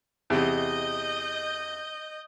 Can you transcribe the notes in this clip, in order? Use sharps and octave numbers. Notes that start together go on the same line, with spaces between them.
E2 C3 D#5 G6